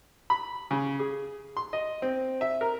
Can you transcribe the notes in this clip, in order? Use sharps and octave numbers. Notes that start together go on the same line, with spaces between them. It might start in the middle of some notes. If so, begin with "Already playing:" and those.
B5
C#3
G#4
C6
D#5
C4
E5
A#4